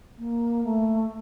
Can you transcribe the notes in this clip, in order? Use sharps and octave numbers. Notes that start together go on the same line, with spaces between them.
A#3
A3